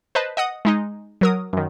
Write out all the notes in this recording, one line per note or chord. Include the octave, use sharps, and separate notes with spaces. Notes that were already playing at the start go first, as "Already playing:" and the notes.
B4 C5 D#5 A5
D#5 F#5 D#6
G#3 D#4 D#5
F#3 A#4 D#6
F#2 D#3